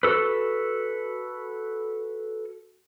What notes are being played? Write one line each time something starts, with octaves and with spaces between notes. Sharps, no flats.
F#4 A4 B4